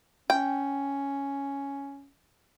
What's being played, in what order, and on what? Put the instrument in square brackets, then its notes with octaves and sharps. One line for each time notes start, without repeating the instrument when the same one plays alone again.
[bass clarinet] C#4 [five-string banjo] G5